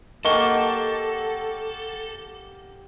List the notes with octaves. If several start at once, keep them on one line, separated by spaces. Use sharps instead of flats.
A#3 G4 A4 D#5 F#5 C#6 G7